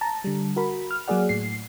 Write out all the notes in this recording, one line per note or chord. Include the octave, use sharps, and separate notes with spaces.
A5 A#5
D3 G3
F#4 A#4 B5
F6
F#3 A#3 G#4 D5 F#5
A2 C7